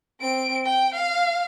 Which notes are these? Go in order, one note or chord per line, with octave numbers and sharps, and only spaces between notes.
C4 D7
G5
F5